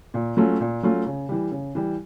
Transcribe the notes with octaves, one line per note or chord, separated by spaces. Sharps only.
A#2
F#3 A3 C#4 F4
A#2
F#3 A3 C#4 F4
C#3
E3 G3
C#3
E3 G3